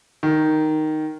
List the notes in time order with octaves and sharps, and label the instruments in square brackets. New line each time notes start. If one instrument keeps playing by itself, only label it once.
[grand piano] D#3